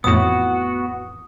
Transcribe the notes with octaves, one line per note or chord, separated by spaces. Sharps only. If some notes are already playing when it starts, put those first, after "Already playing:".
A1 F2 A2 B3 F#4 D#6